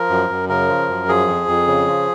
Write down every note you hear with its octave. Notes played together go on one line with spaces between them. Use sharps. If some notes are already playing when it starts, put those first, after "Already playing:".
Already playing: F3 A#4
F#2
F#2
C#3 A#4
F3
F#2
F3 G#4
F2
F2
C#3
F3